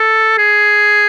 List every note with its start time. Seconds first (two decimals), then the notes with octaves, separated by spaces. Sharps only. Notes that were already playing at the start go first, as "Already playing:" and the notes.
Already playing: A4
0.38 G#4